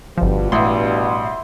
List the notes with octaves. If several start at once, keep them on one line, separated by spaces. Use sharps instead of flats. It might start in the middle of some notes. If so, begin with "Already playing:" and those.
G1 G2 B2 F3
A1 E5 C6